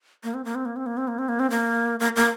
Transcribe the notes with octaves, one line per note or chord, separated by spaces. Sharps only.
A#3
C4
A#3
C4
A#3
C4
A#3
C4
A#3
C4
A#3
C4
A#3
A#3
A#3